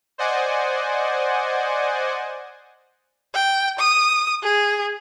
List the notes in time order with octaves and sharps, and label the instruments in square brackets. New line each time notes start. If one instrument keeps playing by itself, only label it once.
[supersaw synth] C5 D5 D#5 F#5 G#5
[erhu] G5
D#6
G#4